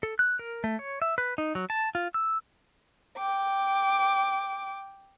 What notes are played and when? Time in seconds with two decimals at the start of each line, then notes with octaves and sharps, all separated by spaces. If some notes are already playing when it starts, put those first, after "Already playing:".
0.03 A4
0.19 F#6
0.39 A#4
0.64 A3
0.79 C#5
1.02 E5
1.18 B4
1.38 D#4
1.55 F#3
1.70 A5
1.95 F4
2.14 E6
3.18 G5 D6